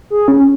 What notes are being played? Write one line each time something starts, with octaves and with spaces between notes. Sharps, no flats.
G#4
C#4